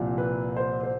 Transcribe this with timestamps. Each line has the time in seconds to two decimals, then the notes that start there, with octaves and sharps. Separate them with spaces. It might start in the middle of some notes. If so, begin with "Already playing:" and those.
Already playing: C2 A#2 F3
0.18 B4
0.57 C5
0.83 C5